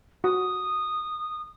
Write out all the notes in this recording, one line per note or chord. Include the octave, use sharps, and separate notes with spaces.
F#4 D#6